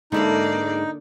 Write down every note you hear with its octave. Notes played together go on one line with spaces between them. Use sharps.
G#2 D3 A#3 D#4 E4 D5 B5